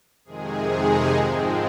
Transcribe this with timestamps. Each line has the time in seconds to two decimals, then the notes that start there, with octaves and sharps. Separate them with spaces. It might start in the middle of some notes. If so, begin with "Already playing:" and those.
0.25 F2 C3 D#3 G#3 G#4
0.67 D#4
1.10 G#2 F3 G#3 C4